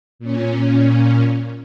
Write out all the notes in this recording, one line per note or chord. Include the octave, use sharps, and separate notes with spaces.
A#2 C#4